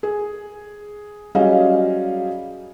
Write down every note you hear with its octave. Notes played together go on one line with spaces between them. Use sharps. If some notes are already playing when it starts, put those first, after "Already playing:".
G#4
F#3 G3 C#4 G#4 D#5 F5